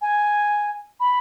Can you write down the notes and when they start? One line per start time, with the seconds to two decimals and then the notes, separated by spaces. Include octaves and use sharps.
0.01 G#5
1.00 B5